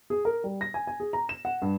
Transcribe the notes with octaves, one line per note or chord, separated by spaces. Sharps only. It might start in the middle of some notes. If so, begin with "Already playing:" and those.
G#4
A#4
G3
A#6
G#5
G#5
G#4
A#5
E7
F#5
G2